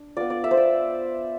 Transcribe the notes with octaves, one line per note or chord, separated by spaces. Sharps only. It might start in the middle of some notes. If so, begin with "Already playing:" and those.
Already playing: D4
B3 F4 D5
D5
E5
C5
D5